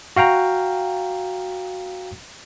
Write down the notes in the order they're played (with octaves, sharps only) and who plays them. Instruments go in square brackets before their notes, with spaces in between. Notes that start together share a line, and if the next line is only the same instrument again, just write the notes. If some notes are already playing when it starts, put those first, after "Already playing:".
[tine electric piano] F#4 F5 G5 A#5